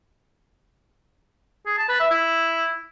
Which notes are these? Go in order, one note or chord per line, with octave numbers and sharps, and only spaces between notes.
G#4
A5
B4
E5
E4